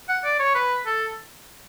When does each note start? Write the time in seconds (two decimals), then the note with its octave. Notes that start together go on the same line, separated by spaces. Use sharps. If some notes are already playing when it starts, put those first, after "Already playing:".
0.09 F#5
0.24 D5
0.39 C#5
0.55 B4
0.86 A4